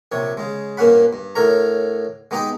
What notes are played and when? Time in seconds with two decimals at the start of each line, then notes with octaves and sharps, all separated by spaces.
0.12 A#1 C3 C#5
0.37 C#3 G#3
0.77 G2 A#2 A#3 C#4 F#5 B5
1.13 G2
1.35 A2 D3 A#4 C#5 A#5
2.31 G#3 B3 D#4 G4 D#5